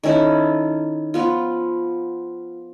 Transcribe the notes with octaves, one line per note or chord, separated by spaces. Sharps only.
D#3 C#4 E4 A4
F3 B3 F4